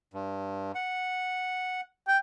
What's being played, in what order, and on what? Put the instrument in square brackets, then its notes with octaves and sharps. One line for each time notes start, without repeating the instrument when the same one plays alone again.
[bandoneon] G2
F#5
[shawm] G5